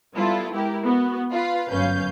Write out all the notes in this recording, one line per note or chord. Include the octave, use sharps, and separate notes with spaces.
G3 B3 E4 F4 A4
G#3 E4 G4 A#4
B3 F#4
F4 B4 F5
G1 F#2 C#4 B4 F5 G6